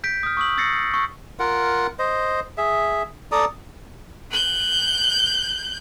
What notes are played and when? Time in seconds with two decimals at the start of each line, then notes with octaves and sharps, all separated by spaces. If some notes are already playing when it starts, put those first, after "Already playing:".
0.04 G6 B6 D7
0.23 D#6 F6
0.37 C#6 D#6 E6 F#7
0.57 D#6 E6 A6 A#6 C7 C#7
0.94 C#6 E6
1.39 F4 A#4 F#5
1.99 C5 D#5
2.58 G#4 E5
3.32 A4 D5 A#5 D#6
4.31 F#6 G6